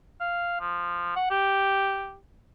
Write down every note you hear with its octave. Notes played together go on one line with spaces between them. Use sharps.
F5
F3
F#5
G4